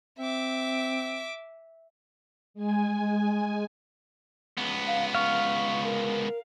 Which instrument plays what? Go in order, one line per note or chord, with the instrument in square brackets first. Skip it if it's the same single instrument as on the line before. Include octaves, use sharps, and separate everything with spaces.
[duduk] C4 [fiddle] E5 D6
[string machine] G#3 G#5
[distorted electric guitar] C#2 B3
[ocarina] F5
[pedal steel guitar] F5 [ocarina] C#6
[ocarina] A#4